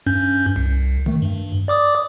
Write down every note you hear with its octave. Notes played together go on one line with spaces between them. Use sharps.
G2 C#4 G6
C2
D#3 A3
G2
D5 D6 D#6